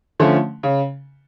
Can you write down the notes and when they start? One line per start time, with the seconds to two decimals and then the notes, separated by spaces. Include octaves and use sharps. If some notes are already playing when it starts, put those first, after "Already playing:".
0.20 D3 F3 A3 C#4
0.63 C#3